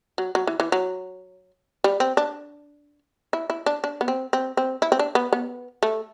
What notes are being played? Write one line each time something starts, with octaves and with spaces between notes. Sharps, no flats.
F#3
F#3
E3
E3
F#3
G3
C4
D4
E4
E4
D4
D4
B3
C4
C4
C4
E4
C4
D4
B3
B3
A3